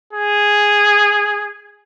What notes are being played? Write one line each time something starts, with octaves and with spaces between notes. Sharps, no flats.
G#4